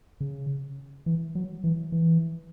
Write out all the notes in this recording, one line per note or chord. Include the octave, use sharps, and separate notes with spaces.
C#3
E3
F#3
E3
E3